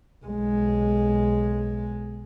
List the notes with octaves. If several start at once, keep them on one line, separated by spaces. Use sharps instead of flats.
B1 G#3